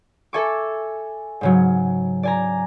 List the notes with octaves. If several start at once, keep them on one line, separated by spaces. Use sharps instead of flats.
A4 E5 G#5 C#6 D6
G#2 C#3 F#3
D5 G#5 A#5